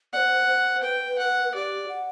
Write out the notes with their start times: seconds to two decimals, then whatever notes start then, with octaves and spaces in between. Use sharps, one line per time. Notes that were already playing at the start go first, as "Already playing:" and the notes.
0.13 D5 F#5
0.17 C5
0.48 C5
0.83 B4 G5
1.18 F#5
1.54 G4 D5
1.89 F#5